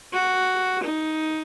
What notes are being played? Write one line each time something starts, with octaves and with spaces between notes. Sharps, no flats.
F#4
D#4